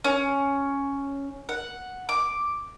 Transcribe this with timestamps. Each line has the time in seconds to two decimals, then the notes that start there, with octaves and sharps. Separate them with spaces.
0.04 C#4
1.49 F#5
2.09 D6